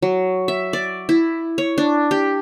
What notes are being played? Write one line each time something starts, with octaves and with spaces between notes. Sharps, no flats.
F#3
E5
D5
E4
C#5
D4
G4